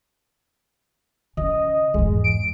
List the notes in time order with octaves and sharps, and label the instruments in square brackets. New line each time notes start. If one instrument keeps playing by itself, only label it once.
[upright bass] C#3 [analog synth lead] D#5
[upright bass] E2 G#2 [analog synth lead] G#3
[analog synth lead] D7